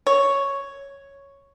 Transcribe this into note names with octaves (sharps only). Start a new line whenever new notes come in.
C#5